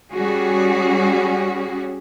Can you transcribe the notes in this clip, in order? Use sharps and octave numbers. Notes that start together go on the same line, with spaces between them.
G3 C#4 F#4 G#4